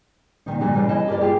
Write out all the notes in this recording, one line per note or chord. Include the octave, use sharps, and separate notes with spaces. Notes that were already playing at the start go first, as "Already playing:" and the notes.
A#2 D#3 D#4
A#2 D3 F#3 G3
C#3 E3 G3
E4 D#5 A5
G4 A#4 D5
F4 G4 G#4